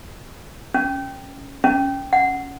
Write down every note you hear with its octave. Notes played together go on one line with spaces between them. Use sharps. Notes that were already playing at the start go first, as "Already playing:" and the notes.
C#4
C#4
F#5